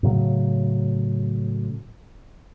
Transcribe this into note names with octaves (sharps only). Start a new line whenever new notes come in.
A2 C#3 F#3